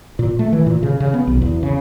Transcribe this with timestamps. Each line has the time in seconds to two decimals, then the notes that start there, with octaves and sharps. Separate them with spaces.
0.19 A#2
0.39 A3
0.53 E3
0.66 A#2
0.83 C#3
1.00 C#3
1.14 B3
1.27 B1
1.42 E2
1.63 C#3